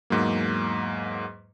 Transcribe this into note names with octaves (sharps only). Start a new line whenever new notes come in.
E2 G#2 F#3 A#3